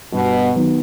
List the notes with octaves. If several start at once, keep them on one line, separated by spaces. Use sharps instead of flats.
G2 B2
D#3 F#3 B3